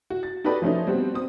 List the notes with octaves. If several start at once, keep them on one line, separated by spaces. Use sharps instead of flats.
F#4
A6
D#4 F#4 G4 A4 B4 D5
F3 A3 C#4 D#4
G3 B3 C4 F#4
C4 D#6